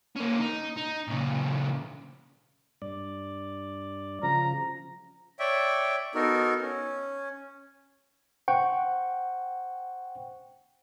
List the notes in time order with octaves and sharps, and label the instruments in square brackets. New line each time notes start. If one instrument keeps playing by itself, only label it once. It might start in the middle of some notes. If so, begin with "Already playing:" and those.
[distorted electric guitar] A#3 C#4
D#4
D#4
A#2 C#3
[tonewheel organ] G2 D5
[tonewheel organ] C#3 F3 [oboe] A#5
[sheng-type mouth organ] C#5 D5 E5 G5
B3 D#4 F#4 A4 A#4
C#4
[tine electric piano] C5 F#5 G5 C#6